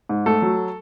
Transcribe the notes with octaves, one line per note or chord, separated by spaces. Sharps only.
G#2
A3 A4
F#3